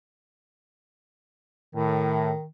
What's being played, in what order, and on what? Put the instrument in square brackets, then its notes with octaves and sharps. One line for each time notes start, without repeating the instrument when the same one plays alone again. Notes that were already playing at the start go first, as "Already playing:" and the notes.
[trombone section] A2 [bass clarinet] D#3